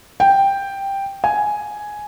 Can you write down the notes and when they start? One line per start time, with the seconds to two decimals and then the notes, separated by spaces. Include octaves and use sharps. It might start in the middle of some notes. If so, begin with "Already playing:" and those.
0.20 G5
1.24 G#5